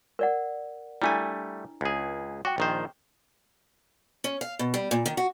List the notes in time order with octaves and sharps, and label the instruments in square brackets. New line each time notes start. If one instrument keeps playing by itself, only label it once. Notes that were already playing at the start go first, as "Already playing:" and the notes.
[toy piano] A#4 D5 F#5
[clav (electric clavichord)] G3 A3 G#5 [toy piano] D4 E4 A#5
[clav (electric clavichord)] C#2 G#4
[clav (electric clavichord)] F#4 [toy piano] G5 D6
[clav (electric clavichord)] A#1 D#3 C5
[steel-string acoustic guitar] C#4
F5
B2
G3
A#2
D#3
F#4